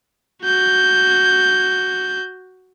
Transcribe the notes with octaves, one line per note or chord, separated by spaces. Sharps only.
F#4 G6